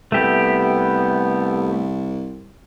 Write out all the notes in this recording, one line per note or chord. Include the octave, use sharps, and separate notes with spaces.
C2 A3 B3 G4